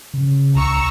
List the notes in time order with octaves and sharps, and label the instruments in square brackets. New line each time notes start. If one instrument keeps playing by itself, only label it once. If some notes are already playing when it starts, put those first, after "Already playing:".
[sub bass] C#3
[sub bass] C#2 [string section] A#5 C#6 E6